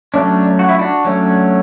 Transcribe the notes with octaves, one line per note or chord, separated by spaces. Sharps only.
F#3 A3 C#4 D4
F#4
E4
D4 F#4
F#3 A3 C#4